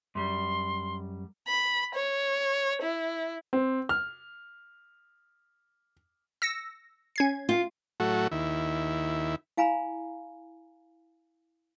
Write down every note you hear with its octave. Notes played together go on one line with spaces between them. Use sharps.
F#2 G3 C6
B5
C#5
E4
C4
F6
E6 A#6 C#7
C#4 G#6 C7
F4
A2 F#3 A3 F#4
D#2 E4
E4 F5 G#5 A#5 B5